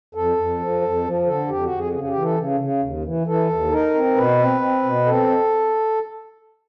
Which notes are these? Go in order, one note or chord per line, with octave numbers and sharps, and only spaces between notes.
F2 A4
F2
F3
F2
F3
D3 A4
F2 G4
F#4
F2
G#4
C#3 G#4
G#4
G4
E3
A4
C#3
C#3
D#2
E3
E3 A4
D#2
D#4 A#4
C4
B2 B4
C4
C4
B2
C4 A4